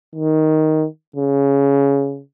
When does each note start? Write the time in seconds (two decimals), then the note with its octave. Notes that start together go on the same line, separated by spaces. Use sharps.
0.16 D#3
1.16 C#3